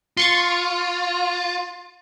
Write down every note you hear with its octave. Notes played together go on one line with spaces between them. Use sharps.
F4 C6 C#6 A6